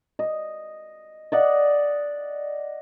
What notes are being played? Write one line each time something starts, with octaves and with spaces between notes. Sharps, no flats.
D#5
D5 D#5 F#5